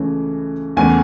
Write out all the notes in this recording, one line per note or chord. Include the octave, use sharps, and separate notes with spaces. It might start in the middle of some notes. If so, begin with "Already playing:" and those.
Already playing: C#2 C#3 E3 A3
E2 C#3 E3 A3 G#5